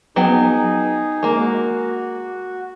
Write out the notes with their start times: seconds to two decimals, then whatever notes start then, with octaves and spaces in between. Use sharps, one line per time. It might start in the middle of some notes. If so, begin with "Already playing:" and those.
0.16 F#3 B3 D#4 G#4 G5
1.23 G#3 A#3
1.39 F#4